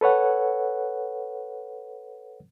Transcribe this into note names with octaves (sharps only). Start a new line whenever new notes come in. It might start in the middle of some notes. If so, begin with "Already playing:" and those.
A4 B4 C#5 F#5